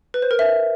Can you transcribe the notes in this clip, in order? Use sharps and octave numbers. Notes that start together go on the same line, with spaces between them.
B4
C5
A#4
E5